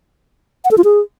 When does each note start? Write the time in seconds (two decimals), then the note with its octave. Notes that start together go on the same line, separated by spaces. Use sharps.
0.65 F#5
0.71 A4
0.78 F4
0.84 G#4